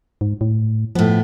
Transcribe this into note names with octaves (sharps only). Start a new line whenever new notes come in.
G#2
A2
A2 F3 B3